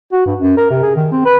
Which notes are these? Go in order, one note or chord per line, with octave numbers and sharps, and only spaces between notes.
F#4
G2
F#2
A#4
C3
G#4
D#3
C4
B4